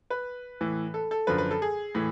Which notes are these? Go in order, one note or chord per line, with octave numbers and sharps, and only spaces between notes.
B4
A2 E3
A4
A4
F#2 D3 F3 B4
B4
A4
G#4
A2 E3